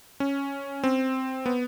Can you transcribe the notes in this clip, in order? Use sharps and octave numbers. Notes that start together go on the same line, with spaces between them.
C#4
C4
B3